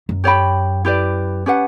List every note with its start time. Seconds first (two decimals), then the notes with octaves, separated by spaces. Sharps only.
0.09 F#2
0.24 G4 C#5 G5 B5
0.85 E4 G4 B4 D5
1.46 C#4 G4 B4 F#5